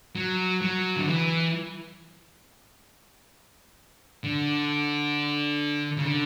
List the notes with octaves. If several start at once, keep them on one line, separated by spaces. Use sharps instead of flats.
F#3
F#3
D3
E3
D3
C#3
D3